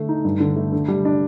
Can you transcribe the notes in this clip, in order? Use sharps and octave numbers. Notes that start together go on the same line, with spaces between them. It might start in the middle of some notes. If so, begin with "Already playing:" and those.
Already playing: D3 A3
D#4
G2
D3
A3
D3
G3
D4